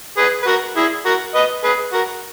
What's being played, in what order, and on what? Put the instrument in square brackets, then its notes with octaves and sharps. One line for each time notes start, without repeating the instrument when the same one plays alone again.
[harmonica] G#4 B4
B4
F#4 A#4
E4 G#4
F#4 A#4
B4 D#5
G#4 B4
F#4 A#4